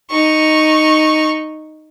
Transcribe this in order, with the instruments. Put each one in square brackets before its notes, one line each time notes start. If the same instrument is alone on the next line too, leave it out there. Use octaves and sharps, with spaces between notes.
[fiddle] D#4 C#6